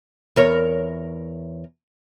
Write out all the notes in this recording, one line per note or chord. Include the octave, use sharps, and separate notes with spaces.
E2 A#4 C#5